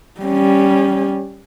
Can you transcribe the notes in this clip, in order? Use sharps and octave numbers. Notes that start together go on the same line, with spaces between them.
G3 C#4